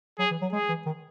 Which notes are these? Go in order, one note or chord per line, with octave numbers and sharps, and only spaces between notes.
F#3 G#4
E3
F#3
G#3 G#4
E3
D#3